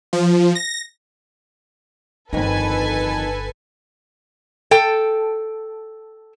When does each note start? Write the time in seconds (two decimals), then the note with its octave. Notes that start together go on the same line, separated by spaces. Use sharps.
0.13 F3
0.55 A#6
2.33 G1 F2 D#3 D4 A4 B4 G#5
4.71 A4 G5